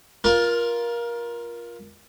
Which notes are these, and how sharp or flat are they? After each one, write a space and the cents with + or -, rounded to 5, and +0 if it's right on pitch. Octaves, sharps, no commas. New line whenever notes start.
F4 +0 A#4 +20